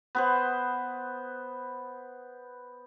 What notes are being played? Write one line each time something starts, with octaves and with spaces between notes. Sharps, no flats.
B3 B4 C5